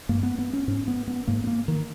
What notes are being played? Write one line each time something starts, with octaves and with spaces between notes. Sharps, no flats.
G2 A#3
B3
B3
C#4
G#2 C#4
B3
B3
G#2 A#3
B3
A#3
D#3